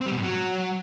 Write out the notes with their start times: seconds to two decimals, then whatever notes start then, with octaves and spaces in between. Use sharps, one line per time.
0.01 C4
0.06 G3
0.11 B2
0.16 G#2
0.21 F#3